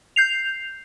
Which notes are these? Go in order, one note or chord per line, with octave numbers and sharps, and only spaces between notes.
G6 C7 F7